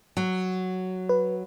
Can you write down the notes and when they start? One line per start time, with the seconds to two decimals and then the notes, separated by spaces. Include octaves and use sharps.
0.17 F#3
1.09 B4